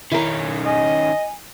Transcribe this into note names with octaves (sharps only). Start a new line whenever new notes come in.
D#3 C#4 E4 A#4
D#5 G#5